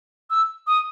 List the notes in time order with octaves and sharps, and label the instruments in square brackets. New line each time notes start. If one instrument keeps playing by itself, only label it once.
[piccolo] E6
D#6